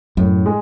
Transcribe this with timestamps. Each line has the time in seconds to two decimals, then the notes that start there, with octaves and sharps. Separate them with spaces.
0.17 F#2 A2
0.46 G#3